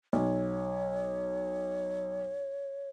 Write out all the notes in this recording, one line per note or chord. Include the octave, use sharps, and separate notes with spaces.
B1 C#5